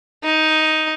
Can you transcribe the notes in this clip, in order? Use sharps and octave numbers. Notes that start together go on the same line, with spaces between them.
D#4